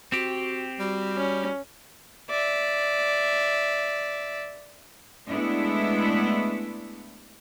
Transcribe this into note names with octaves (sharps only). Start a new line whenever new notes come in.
C4 F#4 G4
G3 F#4
C#4
D5 E5
G#3 A3 B3 D4 E4